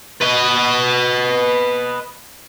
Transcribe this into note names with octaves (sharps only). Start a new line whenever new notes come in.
B4 D#5